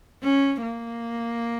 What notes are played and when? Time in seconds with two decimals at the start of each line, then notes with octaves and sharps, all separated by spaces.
0.23 C#4
0.62 A#3